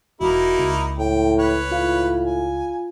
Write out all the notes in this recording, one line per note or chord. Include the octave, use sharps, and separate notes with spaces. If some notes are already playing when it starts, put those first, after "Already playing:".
E1 A#3 D#4 E4 F#4
C#2
A2 G5
B4 C#5
A2 F4 F5
G#5